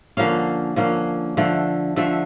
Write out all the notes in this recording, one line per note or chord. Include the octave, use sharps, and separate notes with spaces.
D3 F3 A#3 C#4 F5
D3 F3 A#3 C#4
D3 F3 A3
D3 F3 A3 E5